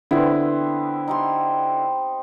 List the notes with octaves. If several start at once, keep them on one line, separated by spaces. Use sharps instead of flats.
D3 B3 C4 E4
D#4 G4 C6